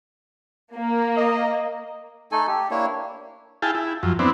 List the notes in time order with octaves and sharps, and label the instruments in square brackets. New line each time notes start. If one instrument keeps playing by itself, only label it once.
[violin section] A#3
[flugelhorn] D#5
[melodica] A3 D#4 A4 G#5
G4
A#3 D4 E4 C#5
[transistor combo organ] E4 G#4 F5 G5 A5
E4
F#2 F3
B3 C4 D4 E4